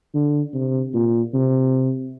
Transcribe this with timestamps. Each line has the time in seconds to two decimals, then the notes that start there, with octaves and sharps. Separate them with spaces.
0.14 D3
0.54 C3
0.94 A#2
1.34 C3